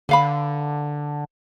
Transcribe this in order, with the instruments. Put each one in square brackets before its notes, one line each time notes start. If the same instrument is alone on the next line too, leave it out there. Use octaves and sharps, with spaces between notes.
[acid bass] D3 [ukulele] B4 F5 B5